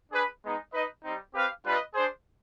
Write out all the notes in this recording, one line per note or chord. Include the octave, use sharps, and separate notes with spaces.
D4 G#4 B4
G#3 B3 D#4
D#4 B4 D#5
G3 C4 D#4
C4 G4 B4 F5
G3 D4 F4 B4 D#5
D4 G#4 C5